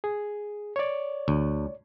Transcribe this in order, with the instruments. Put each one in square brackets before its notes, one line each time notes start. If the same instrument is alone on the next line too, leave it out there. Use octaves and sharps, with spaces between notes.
[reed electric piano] G#4
C#5 D5
[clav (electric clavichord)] D2